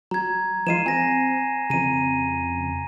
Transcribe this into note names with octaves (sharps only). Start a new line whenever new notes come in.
F#3 A#5 G#6
F3 G#3 F4 C7 D#7 E7
C4 G#5 A#6
F2 C#3 A#5 D#7